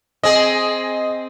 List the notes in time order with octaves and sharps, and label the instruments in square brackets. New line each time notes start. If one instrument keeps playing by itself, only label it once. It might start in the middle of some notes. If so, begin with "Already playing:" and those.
[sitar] C4 G#4 [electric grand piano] D#5